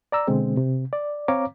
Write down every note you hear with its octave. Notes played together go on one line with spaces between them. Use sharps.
D5 A#5 E6
B2 D3 G#3 C4
C3
D5
C4 C#5 F5 A#5 D6